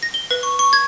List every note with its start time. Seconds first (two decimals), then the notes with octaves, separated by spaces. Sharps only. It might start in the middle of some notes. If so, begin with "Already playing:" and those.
0.03 A#6
0.14 G7
0.31 B4
0.43 C#6
0.59 C#6
0.73 G#6